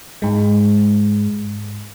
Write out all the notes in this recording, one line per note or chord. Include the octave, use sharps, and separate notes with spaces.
G#2 G#3